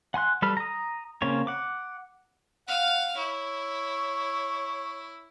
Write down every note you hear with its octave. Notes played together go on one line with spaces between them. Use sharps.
F#5 G#5 C6 F#6
G3 A4 B4 B5 F6
A#5 D#6
C#3 A#3 C4 C#4 C#5
F#5 D6
F5 F#5 F6
E4 C#5